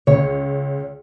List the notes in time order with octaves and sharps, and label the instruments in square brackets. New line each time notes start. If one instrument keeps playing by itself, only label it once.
[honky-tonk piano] C#2 [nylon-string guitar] C#5